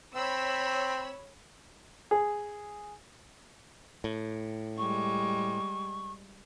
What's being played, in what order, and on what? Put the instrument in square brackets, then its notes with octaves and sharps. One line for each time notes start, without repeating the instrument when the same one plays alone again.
[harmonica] C4 [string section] C#5 B5 E6
[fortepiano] G#4
[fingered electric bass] A2
[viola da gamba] G3 G#3 [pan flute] C#6